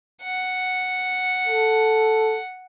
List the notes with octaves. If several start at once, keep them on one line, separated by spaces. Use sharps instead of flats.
F#5
A4